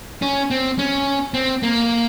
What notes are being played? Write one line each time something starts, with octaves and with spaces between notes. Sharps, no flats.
C#4
C4
C#4
C4
A#3